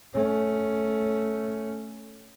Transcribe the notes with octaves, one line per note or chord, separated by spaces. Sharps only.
A3 C#4